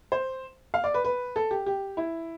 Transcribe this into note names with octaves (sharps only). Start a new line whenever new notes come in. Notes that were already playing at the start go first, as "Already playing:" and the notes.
C5
F5
D5
B4
B4
A4
G4
G4
E4